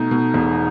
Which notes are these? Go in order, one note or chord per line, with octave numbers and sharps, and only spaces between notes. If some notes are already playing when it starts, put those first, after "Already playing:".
Already playing: B2 A3 D#4
B2
E1